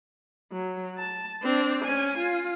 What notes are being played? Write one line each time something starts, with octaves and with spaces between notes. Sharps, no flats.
F#3
A5
C4 D4
C#4 G#5
F4